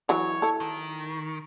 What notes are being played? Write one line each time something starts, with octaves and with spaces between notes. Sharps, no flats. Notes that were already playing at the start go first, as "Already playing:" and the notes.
E3 F#3 C#5
E4 A4
D#3